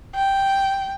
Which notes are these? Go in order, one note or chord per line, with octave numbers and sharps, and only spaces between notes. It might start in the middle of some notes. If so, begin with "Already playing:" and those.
G5